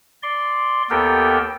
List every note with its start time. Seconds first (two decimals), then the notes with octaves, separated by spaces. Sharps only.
0.23 D5 C6
0.90 D#2 B3 G4 A4 A#4 G5